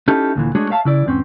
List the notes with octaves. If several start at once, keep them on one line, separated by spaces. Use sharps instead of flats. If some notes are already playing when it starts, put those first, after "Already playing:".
C#4 D#4 E4 G4 A4
D2 A#2 E3
G#3 A3 D4 F#4 G#4 C#5
C#5 E5 F5 A5
C#3 E4 D5
E2 G#2 C4 C#4